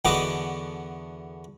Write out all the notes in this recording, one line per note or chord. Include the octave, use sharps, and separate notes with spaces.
E2 D3 B3 F#4 D#5 D6